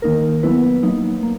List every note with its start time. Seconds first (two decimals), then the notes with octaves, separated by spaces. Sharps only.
0.02 D#3 A#3 D#4 A#4
0.43 F#3 B3 E4 B4
0.83 F#3 A#3 D#4
1.23 A#3